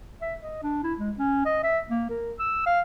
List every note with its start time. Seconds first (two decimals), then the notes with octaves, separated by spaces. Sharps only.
0.21 E5
0.42 D#5
0.63 D4
0.84 E4
0.99 G#3
1.18 C#4
1.46 D#5
1.63 E5
1.90 A#3
2.10 A#4
2.39 E6
2.66 F5